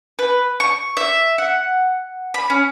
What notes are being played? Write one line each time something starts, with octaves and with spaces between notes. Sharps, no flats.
B4
C#6
E5
F#5
B5
C#4